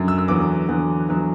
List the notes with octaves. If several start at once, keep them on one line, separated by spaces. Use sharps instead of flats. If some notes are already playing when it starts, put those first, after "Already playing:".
Already playing: F#2 D3 F#3
E6
E6
E2 D3 F#3 B3 D6
E2 D3 F#3 B3
E2 D3 F#3 B3